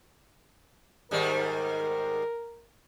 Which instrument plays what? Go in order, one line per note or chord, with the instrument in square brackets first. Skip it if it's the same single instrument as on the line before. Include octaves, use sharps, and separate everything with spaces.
[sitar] G#2 D#3 G3 [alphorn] A#4